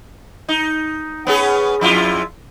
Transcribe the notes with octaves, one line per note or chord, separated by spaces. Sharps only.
D#4
B3 C#4 G#4
F2 E4 F4